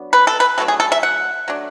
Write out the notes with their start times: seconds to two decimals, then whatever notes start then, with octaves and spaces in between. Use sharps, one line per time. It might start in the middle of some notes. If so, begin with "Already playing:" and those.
Already playing: F#3 B3 D4
0.13 B4
0.27 A4
0.40 B4
0.58 F#3 A3 D4 A4
0.68 G#4
0.80 A4
0.92 E5
1.03 F#5
1.48 F#3 A3 D4